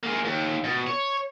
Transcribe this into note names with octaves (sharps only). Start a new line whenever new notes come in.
A#3 G#4
D#2
B2
C#5